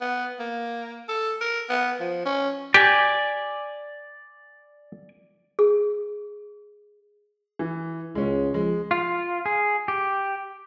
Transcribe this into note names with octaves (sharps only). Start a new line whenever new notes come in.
B3
A#3
A4
A#4
B3
F3
C#4
G4 D5 G#5
G#4
E3
C#2 G#3 C#4
F3 G#3
F4
G#4
G4